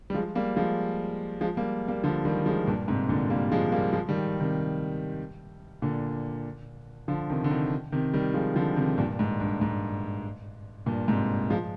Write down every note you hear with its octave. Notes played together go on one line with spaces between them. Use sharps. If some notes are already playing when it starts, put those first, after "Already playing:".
G3
F3 G#3
G3 A#3
F3 G#3
F3 G#3
G3 A#3
G3 A#3
D3 F3
D#3 G3
F3 G#3
G2 A#2
G#2 C3
A#2 D3
G3 A#3
F3 G#3
G3 A#3
F3 G#3
D#3 G3
C3 D#3
A#2 D3
D3 F3
C3 D#3
D3
C3 D#3
C3 D#3
D#3 G3
F3 G#3
D3 F3
C3 D#3
G2 A#2
G#2
G2
G#2
G2 A#2
G#2 C3
F3 G#3